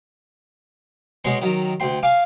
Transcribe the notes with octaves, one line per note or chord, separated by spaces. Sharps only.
B2 G#3 C#5 C6
D#3 F#3
D2 G5 C6
F5 G#5 D6